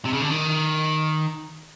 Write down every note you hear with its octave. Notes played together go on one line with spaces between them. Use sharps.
C3
C#3
D3
D#3